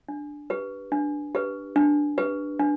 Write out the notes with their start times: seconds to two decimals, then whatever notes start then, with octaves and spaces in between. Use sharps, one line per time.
0.08 D4
0.50 G4 B4
0.92 D4
1.35 G4 B4
1.76 D4
2.18 G4 B4
2.60 D4